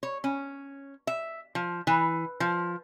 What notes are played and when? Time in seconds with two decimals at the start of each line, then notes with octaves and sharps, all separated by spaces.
0.03 C#5
0.24 C#4
1.07 E5
1.55 F3
1.87 E3
2.40 F3